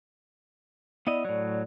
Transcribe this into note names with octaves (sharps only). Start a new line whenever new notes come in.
B3 E4 D5 D#5
A2 F#3